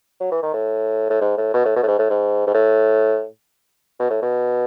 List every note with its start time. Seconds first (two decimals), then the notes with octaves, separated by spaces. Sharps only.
0.20 F#3
0.31 E3
0.43 D#3
0.54 A2
1.10 A2
1.21 G#2
1.38 A2
1.54 B2
1.65 A2
1.76 B2
1.83 A2
1.87 G#2
1.99 A2
2.10 G#2
2.47 G#2
2.54 A2
4.00 B2
4.10 A2
4.22 B2